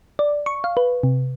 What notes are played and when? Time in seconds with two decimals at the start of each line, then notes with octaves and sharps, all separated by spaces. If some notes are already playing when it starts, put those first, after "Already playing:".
0.19 D5
0.46 C#6
0.64 F5
0.77 B4
1.03 C3